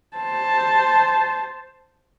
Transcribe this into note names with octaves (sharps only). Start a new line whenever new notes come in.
C5 A5